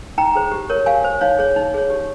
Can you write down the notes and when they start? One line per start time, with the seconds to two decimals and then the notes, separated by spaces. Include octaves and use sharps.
0.18 D#4 G5 A#5
0.35 G#4 C5
0.52 G4
0.70 A#4 C#5
0.86 G4 F5 G#5
1.04 C5
1.21 D#4 C#5 F5
1.39 G#4 C#5
1.56 D#4
1.74 G#4 C#5
1.90 G4